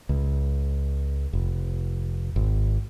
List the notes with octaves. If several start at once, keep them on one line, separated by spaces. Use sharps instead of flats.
C#2
F1
G#1